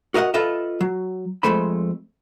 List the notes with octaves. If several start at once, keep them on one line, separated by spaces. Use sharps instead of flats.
F#4 A#4 D#5 E5 F#5
F4 A4 B4 D#5 E5
F#3
F2 F3 G#3 A3 C5 B5